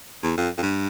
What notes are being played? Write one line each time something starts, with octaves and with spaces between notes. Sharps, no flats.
E2
F2
F2
G2